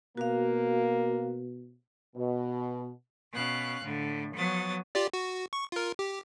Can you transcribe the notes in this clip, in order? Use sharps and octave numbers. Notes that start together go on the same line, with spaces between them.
B2 A#3 F#4 F5
B2
B2 C#4 F5 F#6
A2 D3
F3 F#3 B3 D#6 A6
F4 G4 D5
F#4
C#6
F4 A#4
G4